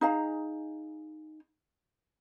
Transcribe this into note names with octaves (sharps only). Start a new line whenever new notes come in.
D#4 G#4 F5 A#5